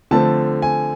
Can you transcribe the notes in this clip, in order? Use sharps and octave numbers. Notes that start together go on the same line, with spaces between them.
D3 F3 A3 C4 A5
G#5